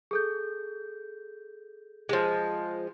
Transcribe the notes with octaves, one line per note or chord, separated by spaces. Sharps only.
G#4 A4 G6
F3 G#3